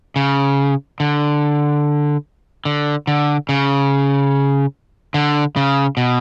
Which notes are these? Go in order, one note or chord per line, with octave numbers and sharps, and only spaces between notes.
C#3
D3
D3
D3
C#3
D3
C#3
B2